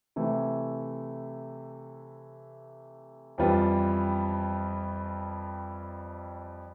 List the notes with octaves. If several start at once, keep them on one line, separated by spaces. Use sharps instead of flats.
C3 E3 A3 E4
F2 E3 G3 B3 F4